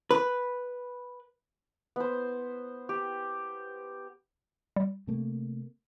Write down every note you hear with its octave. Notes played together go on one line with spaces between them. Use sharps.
B4
B3 C5
G4
G3
C3 A3 A#3